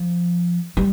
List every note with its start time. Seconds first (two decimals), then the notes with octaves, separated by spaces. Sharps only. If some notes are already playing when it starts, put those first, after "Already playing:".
Already playing: F3
0.77 G3